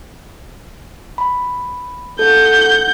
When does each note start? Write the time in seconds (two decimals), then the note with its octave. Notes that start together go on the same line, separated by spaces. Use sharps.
1.18 B5
2.19 A4 F#5 G6